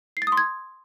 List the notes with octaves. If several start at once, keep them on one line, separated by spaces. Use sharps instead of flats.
C7
A6
D#6
C6
G#6